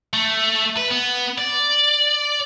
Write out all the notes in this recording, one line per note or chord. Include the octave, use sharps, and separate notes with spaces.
A3
B4
B3
D5